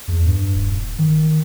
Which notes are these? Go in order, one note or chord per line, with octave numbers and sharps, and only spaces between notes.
E2
G2
D#1
D#3